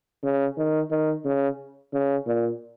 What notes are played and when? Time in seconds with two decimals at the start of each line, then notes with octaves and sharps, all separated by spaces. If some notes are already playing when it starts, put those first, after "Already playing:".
0.23 C#3
0.57 D#3
0.91 D#3
1.25 C#3
1.93 C#3
2.26 A#2